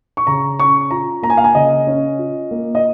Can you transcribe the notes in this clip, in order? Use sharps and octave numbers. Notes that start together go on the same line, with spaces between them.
C#6
C#3 A#5
C#4 C#6
F4 A#5
A#3 A#5
G#5
F5
G#5
C#3 D#5
C#4
F4
A#3
D#5